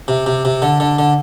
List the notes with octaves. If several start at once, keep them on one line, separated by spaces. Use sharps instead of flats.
C3
C3
C3
D3
D3
D3